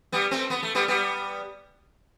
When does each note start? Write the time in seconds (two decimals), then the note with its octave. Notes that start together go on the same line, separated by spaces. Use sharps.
0.12 G3 B3
0.31 A3 C4
0.50 B3
0.63 A3
0.75 G3 B3
0.88 G3 B3